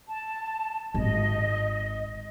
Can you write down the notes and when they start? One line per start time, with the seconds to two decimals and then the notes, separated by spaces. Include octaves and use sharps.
0.08 A5
0.94 G#1 D#5